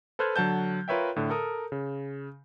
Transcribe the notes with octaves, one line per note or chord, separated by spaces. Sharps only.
A4 B4 C5 F6 F#6 G#6
D3 F#3 F#5 A5 G6
F4 A#4 B4 C#5 E5 G5
A2 D3
A4 A#4 D#6
C#3